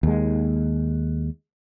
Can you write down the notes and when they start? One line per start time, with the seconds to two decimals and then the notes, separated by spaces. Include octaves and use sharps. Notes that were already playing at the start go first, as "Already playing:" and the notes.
0.03 D#2 G#3